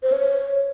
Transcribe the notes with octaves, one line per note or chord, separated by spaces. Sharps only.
C5
C#5